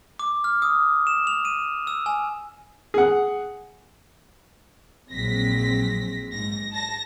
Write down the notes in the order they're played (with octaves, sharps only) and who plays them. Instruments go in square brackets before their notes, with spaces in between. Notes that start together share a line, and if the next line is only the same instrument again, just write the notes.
[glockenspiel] D6
F6
D#6
E7
F7
D#7
E6
G#5
[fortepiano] G#4 F#5
[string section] A#1 F#3 G#3 C4 A#6 B6
G#2 A#6
A5 A#6